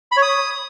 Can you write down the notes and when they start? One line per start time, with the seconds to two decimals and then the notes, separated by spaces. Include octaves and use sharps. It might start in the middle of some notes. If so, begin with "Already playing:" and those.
0.12 B5
0.17 C#5
0.22 D#6